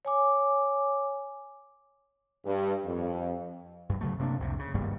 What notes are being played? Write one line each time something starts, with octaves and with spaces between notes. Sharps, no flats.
C#5 G#5 D6
G2
F2
G2 F#3
C#3 F#3 A3
C3 A#3 C#4 D4
C2 F2 A2 C3
C#3
G#1 G2 G3 A#3